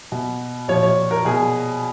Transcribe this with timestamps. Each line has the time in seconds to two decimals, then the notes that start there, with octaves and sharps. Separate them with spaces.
0.12 B2
0.68 A#2 F3 C#5
0.83 C#5
1.11 A#4
1.25 B2 G#4